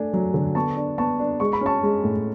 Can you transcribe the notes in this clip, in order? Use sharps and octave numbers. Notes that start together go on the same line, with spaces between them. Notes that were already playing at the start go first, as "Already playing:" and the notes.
Already playing: A3 D4 G#5
F#3
D3
B3 A5 C#6
D4
B3 A5 C#6
D4
G#3 C#6
B5
C#4 A5 C#6
G#3
A2